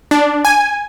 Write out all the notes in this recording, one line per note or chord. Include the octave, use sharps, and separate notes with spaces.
D4
G#5